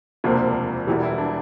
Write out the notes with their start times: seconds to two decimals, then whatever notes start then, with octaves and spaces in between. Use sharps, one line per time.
0.24 E1 D2 C3 F3 A#3 D4
0.87 E1 E2 E3 G3 E4
1.03 E4
1.18 D4